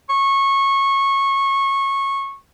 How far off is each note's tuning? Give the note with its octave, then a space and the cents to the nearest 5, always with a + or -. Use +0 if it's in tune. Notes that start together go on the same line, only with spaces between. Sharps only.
C#6 -20